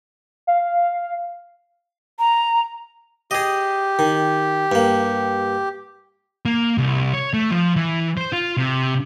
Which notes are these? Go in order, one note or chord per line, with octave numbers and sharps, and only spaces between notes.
F5
A#5
G4 G#4 D#5
D#3
G2 A#3
A#3
C2
C#5
A3
F3
E3
C5
F4
C3